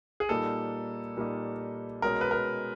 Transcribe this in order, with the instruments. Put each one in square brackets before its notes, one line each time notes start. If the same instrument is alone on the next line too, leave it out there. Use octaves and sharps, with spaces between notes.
[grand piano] G#4
A#2 G3 A#3 D#4 A4
A#2 G3 A#3 D#4
B2 G#3 C#4 A#4
B4
A#4